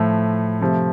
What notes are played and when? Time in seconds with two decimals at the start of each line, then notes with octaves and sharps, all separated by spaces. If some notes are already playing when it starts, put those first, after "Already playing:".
Already playing: A2 F3 A3 A4
0.61 C3 F3 A3